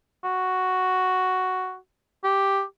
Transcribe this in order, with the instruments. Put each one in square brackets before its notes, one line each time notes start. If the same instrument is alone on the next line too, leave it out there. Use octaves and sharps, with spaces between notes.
[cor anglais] F#4
G4